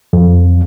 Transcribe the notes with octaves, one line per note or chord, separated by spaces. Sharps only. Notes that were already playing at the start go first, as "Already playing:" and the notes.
F2